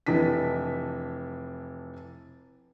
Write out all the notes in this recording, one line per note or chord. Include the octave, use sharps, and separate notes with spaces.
F1 E3 D4 B6